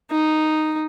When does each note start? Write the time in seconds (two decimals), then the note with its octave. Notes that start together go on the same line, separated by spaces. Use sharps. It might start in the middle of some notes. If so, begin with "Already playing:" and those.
0.11 D#4